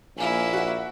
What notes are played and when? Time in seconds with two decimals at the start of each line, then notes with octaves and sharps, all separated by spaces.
0.18 A#1 A#3 E4 G#5
0.53 F#4 E5